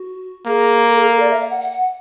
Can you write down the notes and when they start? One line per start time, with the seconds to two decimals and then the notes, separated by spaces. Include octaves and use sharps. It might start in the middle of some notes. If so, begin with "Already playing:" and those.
Already playing: F#4
0.46 A#3 G#4
0.88 A4
0.98 G#4
1.09 A4
1.19 D5
1.30 E5
1.40 F5
1.50 F#5
1.61 F#5
1.71 F#5